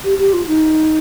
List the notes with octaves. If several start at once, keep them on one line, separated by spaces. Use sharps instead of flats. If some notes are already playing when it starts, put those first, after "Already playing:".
G4
G4
F4
D#4